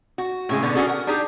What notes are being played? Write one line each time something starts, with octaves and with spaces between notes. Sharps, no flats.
F#4
A2 C#3 G#3
B2 D3 B3
C#4 D4 F#4 G#4 A4
A#4 F#5
D4 D#4 G4 G#4